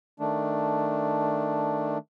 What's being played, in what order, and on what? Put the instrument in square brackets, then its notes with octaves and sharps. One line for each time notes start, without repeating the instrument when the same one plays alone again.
[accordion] D#3 A3 D4